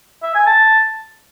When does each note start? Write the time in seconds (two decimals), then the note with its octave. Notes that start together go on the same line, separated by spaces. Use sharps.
0.23 E5
0.35 G#5
0.47 A5